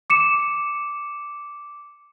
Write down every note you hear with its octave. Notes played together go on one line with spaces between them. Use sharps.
D6 C#7 E7